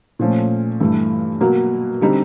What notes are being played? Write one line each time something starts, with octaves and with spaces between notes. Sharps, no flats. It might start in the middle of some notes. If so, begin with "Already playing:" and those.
A#2 F3 A3 C#4
G2 E3 A3
B2 F#3 A#3
D3 G3 C4 D#4